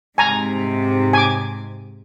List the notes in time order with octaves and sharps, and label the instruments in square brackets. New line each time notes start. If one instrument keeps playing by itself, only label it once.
[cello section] G#2 C3 [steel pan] G#5 A#5
[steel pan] G#5 D6